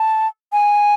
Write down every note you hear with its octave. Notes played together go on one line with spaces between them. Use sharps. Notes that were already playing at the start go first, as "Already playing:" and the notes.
Already playing: A5
G#5